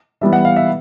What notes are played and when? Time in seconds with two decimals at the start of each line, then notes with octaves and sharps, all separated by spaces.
0.21 E3 G3 B3 E5
0.33 F#5
0.45 F5
0.56 E5